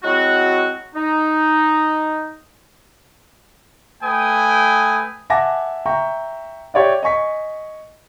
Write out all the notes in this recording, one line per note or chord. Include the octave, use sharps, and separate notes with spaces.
F#3 G#3 C4 E4 F#4
D#4
A3 B4 G5 G#5 D#6
E5 F#5 G#5 A5 D6 A#6
E5 G5 A#5 C#6
G4 C#5 D5 E5
D#5 G#5 C#6 B6